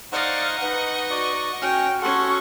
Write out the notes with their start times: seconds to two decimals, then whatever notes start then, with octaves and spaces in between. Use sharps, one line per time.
0.12 D#4 C5 D5 D#5 F5 F#5 C#6
0.61 D#4 B4 F#5
1.11 F#4 D5
1.62 C#4 F#4 G5 F6
2.02 C#4 A4 F#5 C6 C#6